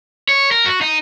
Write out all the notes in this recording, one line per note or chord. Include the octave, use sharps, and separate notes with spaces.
C#5
A#4
F#4
D#4